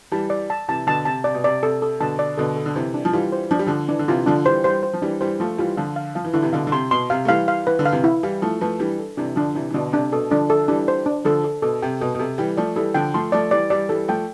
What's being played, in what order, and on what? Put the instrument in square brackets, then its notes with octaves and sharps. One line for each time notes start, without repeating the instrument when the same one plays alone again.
[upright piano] E3 G3 [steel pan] A5
[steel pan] D5
A5
[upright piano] C3 E3 [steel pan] A5
[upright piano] B2 D3 [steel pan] A5
[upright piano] C3 [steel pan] A5
[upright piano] C3 [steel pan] D5
[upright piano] B2
[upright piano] C3 [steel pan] D5
[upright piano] C3 [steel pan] A4
[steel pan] A4
[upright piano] B2 D3 [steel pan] A5
[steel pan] D5
[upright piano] B2 D3 [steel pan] A4
[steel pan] A4
[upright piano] D3
[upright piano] C3 E3 [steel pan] C5
[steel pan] D4
[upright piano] F3
[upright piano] E3 G3 [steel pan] F4
[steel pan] C5
[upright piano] F3 [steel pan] D4
[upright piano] G3
[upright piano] D3 F3 [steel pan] D4
[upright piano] E3 [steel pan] D4
[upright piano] D3
[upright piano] C3 E3 [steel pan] F4
[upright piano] D3 F3 [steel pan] D4
[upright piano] E3 G3 [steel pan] C5
[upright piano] E3 G3 [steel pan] C5
[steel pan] C5
[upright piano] F3
[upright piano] E3 G3 [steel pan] D4
[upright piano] E3 G3 [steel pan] C5
[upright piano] F3 A3 [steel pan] F4
[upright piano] E3 G3 [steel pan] F4
[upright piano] D3 F3 [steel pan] F5
[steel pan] F5
[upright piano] F3 [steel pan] F5
[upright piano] E3
[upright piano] D3 [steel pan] E4
[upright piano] C3 E3
[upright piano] B2 D3 [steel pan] F5
[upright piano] D3
[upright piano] C3 [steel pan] C6
[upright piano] B2 [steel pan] C6
[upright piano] C3 [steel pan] F5
[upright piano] A3
[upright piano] E3 G3 [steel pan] F5
[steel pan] F5
[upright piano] E3 [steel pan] B4
[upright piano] D3
[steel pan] F5
[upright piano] C3 E3
[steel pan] E4
[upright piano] E3 G3 [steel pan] F5
[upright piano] F3 A3 [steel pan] E4
[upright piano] F3 A3 [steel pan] B4
[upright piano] E3 G3 [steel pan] D4
[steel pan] A4
[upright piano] C3 E3 [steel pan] D4
[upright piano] D3 F3 [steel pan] D4
[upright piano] C3 E3 [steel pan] D4
[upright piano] E3
[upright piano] B2 D3 [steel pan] D4
[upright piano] C3 [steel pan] D4
[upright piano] B2 [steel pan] A4
[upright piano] D3 F3 [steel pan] D4
[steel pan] A4
[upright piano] E3 G3 [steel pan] D4
[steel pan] C5
D4
[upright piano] D3 F3 [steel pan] A4
[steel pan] A4
[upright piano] B2 [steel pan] A4
[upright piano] C3 [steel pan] G5
[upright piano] B2 [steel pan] A4
[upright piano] B2
[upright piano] C3 [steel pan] A4
[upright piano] E3 G3 [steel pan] G5
[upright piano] F3 A3 [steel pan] D5
[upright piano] E3 G3 [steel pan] A4
[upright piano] D3 F3 [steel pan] G5
[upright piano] F3 A3 [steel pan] C6
[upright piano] F3 A3 [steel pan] D5
[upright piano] E3 G3 [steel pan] D5
[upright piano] E3 G3 [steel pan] D5
[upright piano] E3 G3 [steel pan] A4
[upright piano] F3 A3 [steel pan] G5